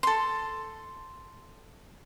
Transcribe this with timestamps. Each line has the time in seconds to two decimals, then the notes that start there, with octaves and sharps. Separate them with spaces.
0.03 A4 C6